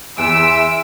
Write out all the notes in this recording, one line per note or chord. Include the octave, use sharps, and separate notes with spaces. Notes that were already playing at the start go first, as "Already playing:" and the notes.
E2 E5 C6 E6 D7